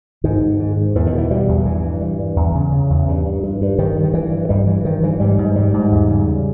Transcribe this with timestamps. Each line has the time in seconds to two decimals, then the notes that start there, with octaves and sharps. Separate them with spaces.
0.24 G#2 D#3
0.43 G#2
0.59 G#2
0.77 G#2
0.95 E2 E3
1.06 D#3
1.13 B2
1.18 E3
1.31 B2 G3
1.48 E2
1.66 G2 E3
1.84 G2
2.01 G2
2.19 G2
2.36 E2
2.55 C#3
2.72 C#3
2.90 E2
3.08 G2
3.26 G2
3.43 G2
3.61 G2
3.78 G2 D#3
3.96 G2
4.03 D#3
4.14 G2 E3
4.31 G2
4.49 G2 G3
4.67 G2 E3
4.85 G2 D#3
5.03 G2 E3
5.20 G#2 G3
5.38 G#2
5.55 G#2 G3
5.74 G#2
5.92 E2
6.09 C#3
6.27 C#3